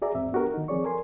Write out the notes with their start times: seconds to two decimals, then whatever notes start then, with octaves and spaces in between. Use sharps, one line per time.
0.02 F#4 G#4 D5 E5 A#5
0.15 E2 G#2 C4 E5
0.32 B3 D4 F#4 G4 A4 A#4
0.54 D#3 D#4
0.68 F3 C4 G#4 C#5 D5 C#6
0.84 A4 A#4 G#5 C6